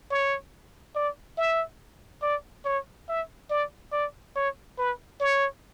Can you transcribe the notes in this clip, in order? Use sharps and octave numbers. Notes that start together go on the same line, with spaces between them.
C#5
D5
E5
D5
C#5
E5
D5
D5
C#5
B4
C#5